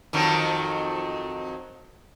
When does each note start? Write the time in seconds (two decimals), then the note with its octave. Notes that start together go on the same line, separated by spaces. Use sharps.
0.13 F2 D#3 F#3